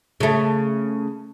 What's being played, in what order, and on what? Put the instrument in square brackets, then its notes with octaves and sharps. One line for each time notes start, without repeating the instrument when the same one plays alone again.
[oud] C#3 A3